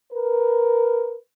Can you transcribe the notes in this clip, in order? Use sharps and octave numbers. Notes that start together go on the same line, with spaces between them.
A#4 B4